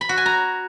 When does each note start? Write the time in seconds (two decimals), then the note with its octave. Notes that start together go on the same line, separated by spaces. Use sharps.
0.01 B5
0.09 F#4
0.17 G#5
0.26 A#5